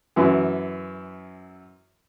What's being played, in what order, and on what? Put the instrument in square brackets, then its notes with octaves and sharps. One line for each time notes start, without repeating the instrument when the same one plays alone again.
[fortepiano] F#2 E3